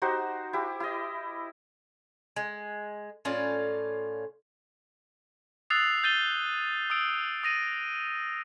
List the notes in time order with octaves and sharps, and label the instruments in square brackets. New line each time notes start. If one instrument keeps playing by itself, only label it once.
[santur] D#4 F#4 G4 C5
E4 G4
E4 D#5
[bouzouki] G#3
A2 C#4 F4 D5
[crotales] D#6 E6 F#6 A6 C7 F7
G6 A6 D#7 G7
D#6 E6 D7
D#6 A#6 D#7